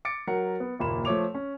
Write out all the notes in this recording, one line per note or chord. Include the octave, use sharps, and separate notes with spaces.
D6 A6 C#7 D7
F#3 A#4 F#5 C#7
B3
F#1 D#2 A#2 A#3 B5 E7
F3 A3 C#5 D6 F7
C#4